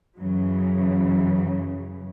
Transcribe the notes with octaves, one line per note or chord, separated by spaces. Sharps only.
F#2 C#3 E3 F#3